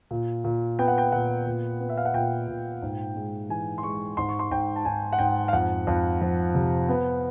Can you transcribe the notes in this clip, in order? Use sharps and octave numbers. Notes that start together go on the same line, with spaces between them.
A#2
A#2
B3 G5
F#5
G5
A#2 F#5
A#2
B3
E5
F5
F#5
A#2 G5
A#2
G#2
G#3
E3 G#5
C6
G#3 C#6
G#2 C6
C#6
C6
G#2 G5
A5
G#2 G#5
F#5
G#2 G5
F5
F2 F#5
F2
F3
C3
B3